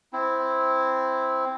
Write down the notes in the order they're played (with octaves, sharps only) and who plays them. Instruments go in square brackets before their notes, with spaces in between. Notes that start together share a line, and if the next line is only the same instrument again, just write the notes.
[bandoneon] C4 E4